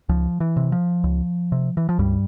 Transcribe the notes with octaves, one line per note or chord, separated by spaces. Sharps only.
C#2 F3
E3
C3
F3
C#2
C3
E3
F3
C#2 G2 G3